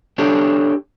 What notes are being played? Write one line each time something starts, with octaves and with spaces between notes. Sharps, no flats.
D4 G4 A4 C#5